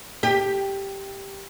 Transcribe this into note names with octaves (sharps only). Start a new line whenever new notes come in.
G4